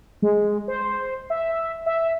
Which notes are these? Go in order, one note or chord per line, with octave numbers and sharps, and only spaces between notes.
G#3
C5
E5
E5